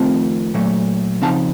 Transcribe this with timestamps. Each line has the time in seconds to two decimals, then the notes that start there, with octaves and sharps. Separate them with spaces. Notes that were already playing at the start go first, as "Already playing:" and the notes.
Already playing: F2 D#3 A3 C4 F4 A5
0.54 A#2 F#3 A3
1.22 C#3 F3 C4 D#4 F5 A5